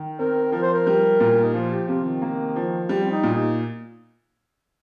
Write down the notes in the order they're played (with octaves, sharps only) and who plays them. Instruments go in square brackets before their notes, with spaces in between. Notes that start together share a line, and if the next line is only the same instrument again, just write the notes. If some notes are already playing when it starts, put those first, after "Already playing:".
Already playing: [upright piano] D#3
[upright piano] C4 [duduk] A#4
[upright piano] F3 [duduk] A#4
[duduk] C5
A#4
[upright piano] G3
A#2
[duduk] D#4
[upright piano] F3 [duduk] F4
[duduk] G4
[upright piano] C3 [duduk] F4
[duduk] D#3
[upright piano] A#3
F3
G3
[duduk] C4
D#4
[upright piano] A#2
[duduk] D#4